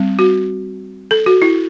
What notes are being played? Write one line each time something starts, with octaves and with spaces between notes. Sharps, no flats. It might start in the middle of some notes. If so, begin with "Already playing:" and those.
Already playing: G3 C4
F#4
A4
F#4
E4